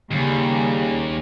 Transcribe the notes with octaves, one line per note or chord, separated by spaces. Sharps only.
D#2 C#3 G3 A#3